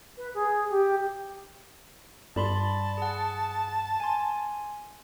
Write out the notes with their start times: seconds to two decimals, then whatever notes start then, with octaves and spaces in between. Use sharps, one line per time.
0.17 B4
0.34 G#4
0.70 G4
2.36 G2 D5 A5 B5 C6
2.97 G#4 F#5
4.00 G#5 C6